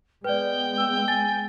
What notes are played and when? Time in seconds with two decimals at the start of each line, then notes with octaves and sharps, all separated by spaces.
0.24 G#3 B3 B4 D5 G5
0.77 E6
1.08 G#5 A6